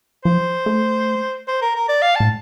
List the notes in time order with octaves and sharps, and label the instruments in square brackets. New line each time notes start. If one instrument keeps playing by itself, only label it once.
[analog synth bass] F3 [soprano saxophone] C5
[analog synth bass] A3
[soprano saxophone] C5
A#4
A#4
D5
F5
[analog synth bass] A2 [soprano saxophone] A5